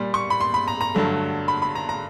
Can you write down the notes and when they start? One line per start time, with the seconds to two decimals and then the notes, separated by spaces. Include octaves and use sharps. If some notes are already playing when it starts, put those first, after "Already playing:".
Already playing: A#2 G3
0.14 C#6
0.30 B5
0.41 C6
0.54 B5
0.68 A#5
0.81 A#5
0.95 G2 D3 F#3 A3
1.48 B5
1.62 B5
1.75 A#5
1.89 A#5